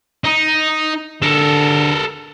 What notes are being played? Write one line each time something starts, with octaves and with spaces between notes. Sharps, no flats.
D#4
D3 A4 A#4